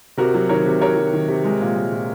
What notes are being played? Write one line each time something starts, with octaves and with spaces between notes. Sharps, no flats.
C3 F#4 A#4
F#3
D#3 A#4 C#5
C3
C3 A#4 C#5
F#3
D#3
C3
G#3
A#2
G#3
A#2